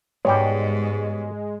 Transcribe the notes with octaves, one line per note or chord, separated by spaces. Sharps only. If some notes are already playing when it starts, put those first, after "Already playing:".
G#2 B2 G3 G#3 G4 C#5